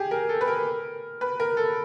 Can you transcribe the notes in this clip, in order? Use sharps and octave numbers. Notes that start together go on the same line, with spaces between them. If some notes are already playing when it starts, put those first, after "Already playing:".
Already playing: G4 G#4
A#4
A4
B4
A#4
B4
A#4
A4